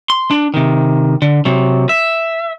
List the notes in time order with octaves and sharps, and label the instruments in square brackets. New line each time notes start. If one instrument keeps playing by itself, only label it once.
[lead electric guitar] C6
D4
C3 D#3
D3
C3 F#3
E5